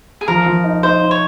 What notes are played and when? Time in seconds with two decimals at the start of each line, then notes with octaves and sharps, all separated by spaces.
0.21 G#4
0.28 F3 A#4
0.46 F3
0.64 D#4
0.83 D#4 C5
1.01 D#4
1.11 C#5